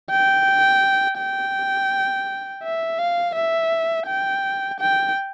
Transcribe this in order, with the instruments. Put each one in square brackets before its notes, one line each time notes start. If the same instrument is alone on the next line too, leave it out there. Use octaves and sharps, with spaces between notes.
[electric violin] G5
G5
E5
F5
E5
G5
G5